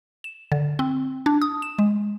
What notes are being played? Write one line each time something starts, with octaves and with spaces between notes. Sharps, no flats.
E7
D3
C4
D4
D#6
E7
G#3